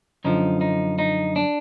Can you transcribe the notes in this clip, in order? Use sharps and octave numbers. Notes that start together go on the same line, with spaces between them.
F#2 D3 F3 D#4
D#4
D#4
D4